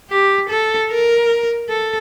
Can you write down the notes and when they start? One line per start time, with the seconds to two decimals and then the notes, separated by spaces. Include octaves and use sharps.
0.10 G4
0.49 A4
0.90 A#4
1.69 A4